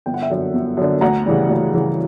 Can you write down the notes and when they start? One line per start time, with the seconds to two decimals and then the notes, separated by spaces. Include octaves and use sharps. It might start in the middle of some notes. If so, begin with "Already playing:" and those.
0.06 G1 G5
0.14 F#5
0.22 E5 G5
0.30 F#2 D3
0.53 G1
0.77 F#2 D3
1.01 D2 F#5 A#5
1.26 C#3 E3 G3
1.49 D2
1.74 C#3 E3 G3